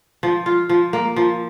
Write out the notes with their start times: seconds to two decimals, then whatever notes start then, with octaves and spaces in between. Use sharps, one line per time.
0.23 F3
0.46 F4
0.69 F3
0.93 A#3
1.16 F3